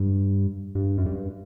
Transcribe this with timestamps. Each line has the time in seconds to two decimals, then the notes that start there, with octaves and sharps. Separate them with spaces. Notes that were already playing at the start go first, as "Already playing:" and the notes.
Already playing: G2
0.75 G2
0.98 F#2
1.06 G2